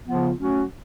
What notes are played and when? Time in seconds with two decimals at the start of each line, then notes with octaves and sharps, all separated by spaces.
0.07 C#3 F3 B3 F4
0.38 F#3 A3 C#4 F#4